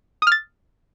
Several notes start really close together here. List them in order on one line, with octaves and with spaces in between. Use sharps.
D#6 F6 A6